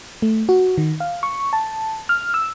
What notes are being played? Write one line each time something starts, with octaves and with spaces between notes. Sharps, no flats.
A3
F#4
D#3
F5
C#6
A5
F6
E6